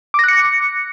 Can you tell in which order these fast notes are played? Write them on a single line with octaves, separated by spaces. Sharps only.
D6 A#6 F#6 C#7